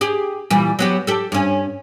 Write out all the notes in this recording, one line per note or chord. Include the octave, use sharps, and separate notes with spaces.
G4 G#4
A#2 E3 G3
F#3 B3 G4
G4 A4
G2 C#4